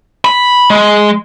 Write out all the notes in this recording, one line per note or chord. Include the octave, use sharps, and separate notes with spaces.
B5
G#3